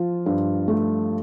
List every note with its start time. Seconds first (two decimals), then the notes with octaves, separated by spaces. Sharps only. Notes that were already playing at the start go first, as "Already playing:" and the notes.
Already playing: F3 F4
0.26 G2
0.68 A3